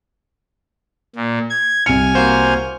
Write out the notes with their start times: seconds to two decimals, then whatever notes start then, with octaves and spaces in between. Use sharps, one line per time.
1.15 A#2
1.50 G#6
1.86 C2 G#5 F6 C#7
2.15 A#3 F#4 C5